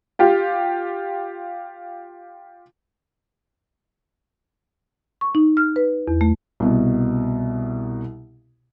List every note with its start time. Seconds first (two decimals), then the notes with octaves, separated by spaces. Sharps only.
0.19 F4 G4
5.21 C#6
5.35 D#4
5.57 F6
5.76 B4
6.08 E2
6.21 A3
6.60 C2 B2